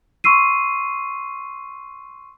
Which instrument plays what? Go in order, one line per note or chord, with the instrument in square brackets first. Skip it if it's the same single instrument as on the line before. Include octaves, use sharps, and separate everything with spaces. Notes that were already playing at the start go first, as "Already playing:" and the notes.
[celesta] C6 C#6 E6 C7 D#7